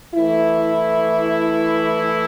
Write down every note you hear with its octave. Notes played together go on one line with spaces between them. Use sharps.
E3 A3 E4